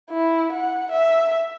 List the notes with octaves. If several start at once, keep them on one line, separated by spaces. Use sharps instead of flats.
E4
F#5
E5